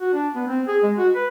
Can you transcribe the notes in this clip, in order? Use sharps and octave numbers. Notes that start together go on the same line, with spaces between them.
F#4
D4
B3
C4
G#4
G#3
F#4
B4